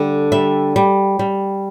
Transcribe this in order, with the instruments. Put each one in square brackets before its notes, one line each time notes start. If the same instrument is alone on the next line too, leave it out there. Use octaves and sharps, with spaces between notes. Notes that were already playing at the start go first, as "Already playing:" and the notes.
Already playing: [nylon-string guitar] D3 G3
G3 E5
G3
G3